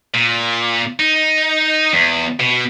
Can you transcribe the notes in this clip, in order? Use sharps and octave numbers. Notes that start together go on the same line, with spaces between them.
A#2
D#4
E2
B2